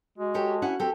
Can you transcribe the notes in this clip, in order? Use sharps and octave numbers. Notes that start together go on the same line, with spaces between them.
G#3 F#4
G4 A4 C#5
C#4 E4 F#5
C4 G4 A4